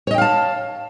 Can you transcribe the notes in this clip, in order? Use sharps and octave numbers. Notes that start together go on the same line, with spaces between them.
C#5 D#5 F5 G5 A5